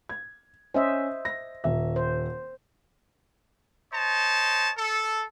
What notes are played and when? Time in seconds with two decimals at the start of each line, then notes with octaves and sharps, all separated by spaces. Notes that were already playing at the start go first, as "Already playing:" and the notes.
0.09 G#6
0.74 C#4 C5 D#5 E5
1.25 A#6
1.64 D#1 E5
1.96 C5
3.93 C5 C#5 D#5 A5
4.77 A4